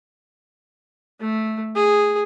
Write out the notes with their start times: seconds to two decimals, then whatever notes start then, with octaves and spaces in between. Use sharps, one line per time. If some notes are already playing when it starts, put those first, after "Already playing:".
1.20 A3
1.75 G#4